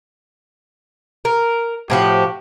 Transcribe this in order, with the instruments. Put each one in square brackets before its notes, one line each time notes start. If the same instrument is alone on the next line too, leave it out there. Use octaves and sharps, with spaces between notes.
[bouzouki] A#4
[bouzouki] A2 F3 F#4 [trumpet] G4